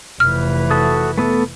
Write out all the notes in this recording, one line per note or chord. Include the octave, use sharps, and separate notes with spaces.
F1 E3 F6
F#4 A4 D#6
A3 B3 A4